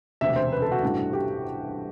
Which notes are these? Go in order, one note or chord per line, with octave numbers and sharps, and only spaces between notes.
E1 D2 C3 E5
C5
B4
A4
F#4
A1 G2 E3 A3 D4
G4